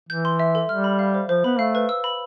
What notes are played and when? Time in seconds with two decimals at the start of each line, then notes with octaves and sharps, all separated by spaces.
0.09 E3 G6
0.25 C6
0.39 E5
0.55 A4
0.69 G3 F6
0.84 B5
0.99 F5
1.14 C5
1.29 F3 C5
1.44 B3 B5
1.59 A3 F5
1.75 B4
1.89 E6
2.04 B5